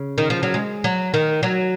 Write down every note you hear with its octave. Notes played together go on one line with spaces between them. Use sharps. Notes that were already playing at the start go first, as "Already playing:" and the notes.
Already playing: C#3
D#3
F3
F#3
G#3
F#3
D#3
F#3